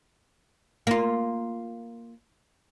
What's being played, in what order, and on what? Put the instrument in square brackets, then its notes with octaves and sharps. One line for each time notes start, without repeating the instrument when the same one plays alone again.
[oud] A#3 F4